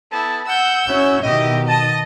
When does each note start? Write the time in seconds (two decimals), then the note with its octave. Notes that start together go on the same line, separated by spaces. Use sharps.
0.12 B3 E4 A4 A5
0.48 F#5 E6 G6
0.88 C#4 E4 F#4 C#5
1.23 B2 D#3 E4 G4 D#5
1.68 D#5 A5 D#6